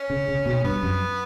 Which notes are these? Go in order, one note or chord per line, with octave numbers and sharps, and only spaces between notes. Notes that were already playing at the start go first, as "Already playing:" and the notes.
Already playing: C#4
C#3
C#3
B2
G2 B3
F#2